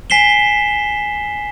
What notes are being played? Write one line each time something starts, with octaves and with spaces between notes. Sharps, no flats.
G#5 B6 C7 E7 G7